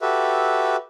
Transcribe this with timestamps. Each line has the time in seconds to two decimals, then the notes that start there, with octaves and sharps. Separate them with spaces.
0.02 F#4 G4 A4 B4 E5